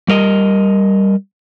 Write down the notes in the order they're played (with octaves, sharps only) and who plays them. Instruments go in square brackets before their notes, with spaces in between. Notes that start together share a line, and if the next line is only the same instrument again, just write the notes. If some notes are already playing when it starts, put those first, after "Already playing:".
[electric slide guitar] G3 A#4 D#5